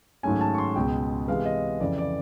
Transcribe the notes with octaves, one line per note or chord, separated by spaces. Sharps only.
G#2 D#3 F#3 A3 C#4 G#5
A5
C#6
C6
C#2 B2 G#3 G5
C3 E3 G#3 B3 F5
D#5
F2 C#3 E3 D5
D5